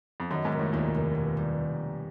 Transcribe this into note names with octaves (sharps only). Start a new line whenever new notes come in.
F2
F#2 D#3
G#2
F1
A2
D#2 A#2
F1
B2
G3